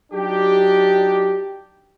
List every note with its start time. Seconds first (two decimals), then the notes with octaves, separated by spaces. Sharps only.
0.13 F#3 D4 D#4 G4